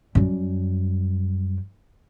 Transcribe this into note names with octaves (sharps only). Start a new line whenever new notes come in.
F#2 G3